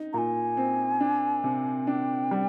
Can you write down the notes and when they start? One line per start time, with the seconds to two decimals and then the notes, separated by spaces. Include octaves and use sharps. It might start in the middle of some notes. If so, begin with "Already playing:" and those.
Already playing: D#4
0.13 A#2 G#5 A#5
0.57 C4
1.01 D4
1.44 C3
1.87 D4 G5
2.31 G3